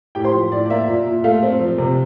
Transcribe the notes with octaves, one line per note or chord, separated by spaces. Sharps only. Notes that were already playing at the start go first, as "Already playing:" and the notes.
A2 G4 G5
C5 C6
F3
A2 D5
D5
A#3 E5
A#2
A#2
A3 F4 F5
C4
F3
C3